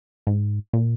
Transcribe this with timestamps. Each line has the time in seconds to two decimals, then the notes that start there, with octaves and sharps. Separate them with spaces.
0.27 G#2
0.73 A#2